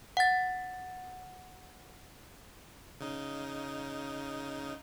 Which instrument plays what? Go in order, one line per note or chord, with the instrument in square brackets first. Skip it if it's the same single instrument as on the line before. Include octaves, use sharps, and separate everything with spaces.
[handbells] F#5 A6
[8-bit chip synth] C#3 D#4